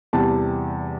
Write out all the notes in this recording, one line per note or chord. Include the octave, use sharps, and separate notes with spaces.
E2 C3 E3 G3 A5